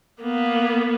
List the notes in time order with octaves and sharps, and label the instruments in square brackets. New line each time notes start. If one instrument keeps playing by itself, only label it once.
[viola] A#3 B3